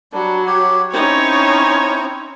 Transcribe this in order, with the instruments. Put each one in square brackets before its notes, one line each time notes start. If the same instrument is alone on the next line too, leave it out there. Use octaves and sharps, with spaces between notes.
[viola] F#3 [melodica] G3 D4
[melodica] G4 C#5
[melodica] C4 E4 C5 [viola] C#4 D#4 [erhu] C#5